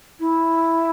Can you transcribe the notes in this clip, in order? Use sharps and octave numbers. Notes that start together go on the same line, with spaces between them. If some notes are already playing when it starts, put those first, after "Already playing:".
E4